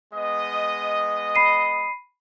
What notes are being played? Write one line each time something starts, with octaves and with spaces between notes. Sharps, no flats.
G#3 B3 D#5
B5 C7 D#7